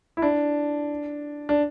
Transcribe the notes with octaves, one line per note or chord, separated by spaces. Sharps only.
E4
D4
D4